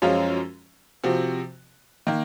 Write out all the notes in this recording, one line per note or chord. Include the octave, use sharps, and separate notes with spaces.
F#2 F3 G#3 C#4 F4
C3 F3 C4 F#4
D#3 A#3